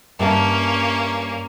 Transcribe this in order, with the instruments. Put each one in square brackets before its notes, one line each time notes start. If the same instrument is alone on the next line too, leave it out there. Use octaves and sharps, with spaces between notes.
[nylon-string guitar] G2 E5 A5 [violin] A#3 C#4